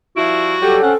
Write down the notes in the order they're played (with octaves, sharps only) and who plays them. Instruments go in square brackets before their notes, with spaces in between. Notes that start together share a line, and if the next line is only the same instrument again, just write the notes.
[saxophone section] F3 G3 E4 [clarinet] F#4
[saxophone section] F#3 G3 [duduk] G4 [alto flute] A4
[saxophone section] C4 [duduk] C#4 [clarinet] F#5